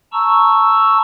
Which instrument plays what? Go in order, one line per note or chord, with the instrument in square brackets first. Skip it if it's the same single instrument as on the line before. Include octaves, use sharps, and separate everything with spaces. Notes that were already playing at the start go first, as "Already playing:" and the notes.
[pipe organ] A5 A#5 C#6 E6